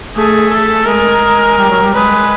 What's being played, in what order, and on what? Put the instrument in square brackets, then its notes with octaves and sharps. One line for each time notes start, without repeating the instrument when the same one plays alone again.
[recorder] A3 [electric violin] G#4
[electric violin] A4
[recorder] G#3 [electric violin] A#4
[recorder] G3
F#3
G3
[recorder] G#3 [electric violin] B4